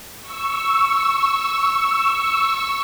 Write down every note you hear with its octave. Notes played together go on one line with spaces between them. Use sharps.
C#6 E6